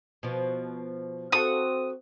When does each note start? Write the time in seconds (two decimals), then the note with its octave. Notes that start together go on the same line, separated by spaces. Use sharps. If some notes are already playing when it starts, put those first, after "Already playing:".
0.23 B2 F3
1.32 C4 F#4 A4 F5 D#6